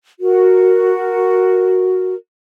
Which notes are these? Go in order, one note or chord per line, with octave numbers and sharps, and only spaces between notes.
F#4 A#4